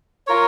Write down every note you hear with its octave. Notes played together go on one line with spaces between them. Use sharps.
F4 A#4 C#5